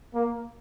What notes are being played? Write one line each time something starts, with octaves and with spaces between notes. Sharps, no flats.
A#3